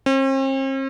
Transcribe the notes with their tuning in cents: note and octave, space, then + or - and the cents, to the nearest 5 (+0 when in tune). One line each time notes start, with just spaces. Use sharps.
C4 +45